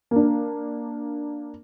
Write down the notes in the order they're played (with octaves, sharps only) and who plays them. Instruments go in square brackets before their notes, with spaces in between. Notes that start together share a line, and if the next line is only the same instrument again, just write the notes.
[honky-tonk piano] A#3 D4